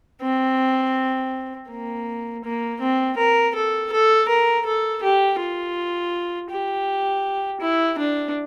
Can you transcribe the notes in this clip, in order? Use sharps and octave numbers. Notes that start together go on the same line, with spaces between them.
C4
A#3
A#3
C4
A#4
A4
A4
A#4
A4
G4
F4
G4
E4
D4